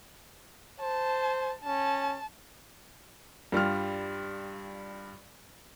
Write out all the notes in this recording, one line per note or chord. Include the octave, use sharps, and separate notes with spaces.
C5 A5
C#4 A5
G2 G3 F4 F6